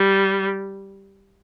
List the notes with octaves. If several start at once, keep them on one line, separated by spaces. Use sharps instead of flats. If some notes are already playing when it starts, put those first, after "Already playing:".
Already playing: G3